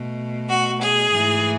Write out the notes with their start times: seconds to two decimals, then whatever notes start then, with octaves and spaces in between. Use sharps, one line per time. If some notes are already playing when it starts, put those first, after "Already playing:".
Already playing: B2 A3
0.48 F#4
0.80 G#4
1.11 G#2 E3 A3